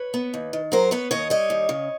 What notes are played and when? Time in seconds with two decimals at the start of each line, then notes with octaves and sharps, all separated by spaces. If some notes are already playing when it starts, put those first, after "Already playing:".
Already playing: B4 C#5
0.14 B3
0.34 D#2
0.53 D#3
0.72 F#3 A#4 C5
0.91 B3 B4 C#5
1.11 D#2 C#5 D#5
1.30 G3 C#5 D#5
1.50 D#2
1.69 C#3